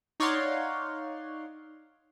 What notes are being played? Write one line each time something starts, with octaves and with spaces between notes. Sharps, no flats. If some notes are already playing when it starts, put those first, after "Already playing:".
D#4 C#5 D5 F5 F#5 C6